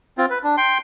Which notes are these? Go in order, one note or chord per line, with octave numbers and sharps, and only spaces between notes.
C4 F4
B4
D4
G5 C6